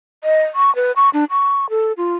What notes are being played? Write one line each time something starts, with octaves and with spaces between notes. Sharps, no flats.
D#5
C#6
B4
C#6
D4
C#6
A4
F4